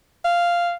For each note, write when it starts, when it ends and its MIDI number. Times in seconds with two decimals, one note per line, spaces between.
0.25 0.73 77